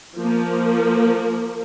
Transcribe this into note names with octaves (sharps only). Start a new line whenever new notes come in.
F3 A#3